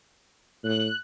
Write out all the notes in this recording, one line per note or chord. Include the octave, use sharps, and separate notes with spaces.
A2 F#6